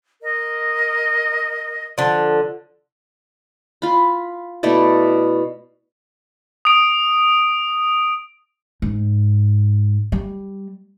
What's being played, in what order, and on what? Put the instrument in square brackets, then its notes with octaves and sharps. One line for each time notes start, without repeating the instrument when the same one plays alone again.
[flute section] A#4 D#5
[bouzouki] D3 F3
[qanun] F4 B5
B2 A3 E4 D5
[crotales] D#6 D7
[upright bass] G#2
G3